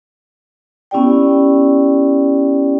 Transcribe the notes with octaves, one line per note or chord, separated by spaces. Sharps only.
B3 C#4 E4 G4 D5 G5